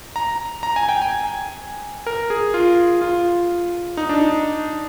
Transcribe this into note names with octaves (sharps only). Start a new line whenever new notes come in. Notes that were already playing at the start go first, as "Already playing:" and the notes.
A#5
A#5
G#5
G5
G#5
A#4
G#4
F4
F4
D#4
D4
D#4